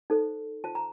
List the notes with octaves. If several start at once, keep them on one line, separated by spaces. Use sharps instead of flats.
D#4 A4 C5
F4 C5 A5
A#5